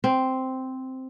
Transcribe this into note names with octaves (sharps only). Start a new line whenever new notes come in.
C4